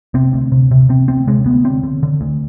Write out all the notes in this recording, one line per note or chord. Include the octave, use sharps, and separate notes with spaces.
C3 C4
D2
C3
C3
C3 C4
D2 C4
C3 G#3
D2 B3
D3 C4
D3
D3
D2